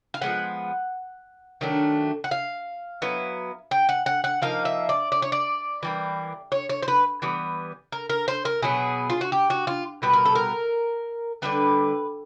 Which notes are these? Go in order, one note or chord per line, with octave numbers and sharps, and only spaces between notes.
F5
F3 G#3 B3 F#5
D#3 F#3 A3 D4
F#5
F5
F#3 B3 E4
G5
F#5
F#5
F#5
F3 A#3 D#4 F5
E5
D5
D5
C#5
D5
E3 G3 A#3
C#5
C#5
C5
B4
E3 G3 B3
A#4
A#4
C5
A#4
B2 F#3 B3 G#4
F4
F#4
G4
F#4
F4
B2 G3 B3 B4
A#4
A4
A#4
D3 G3 B3 B4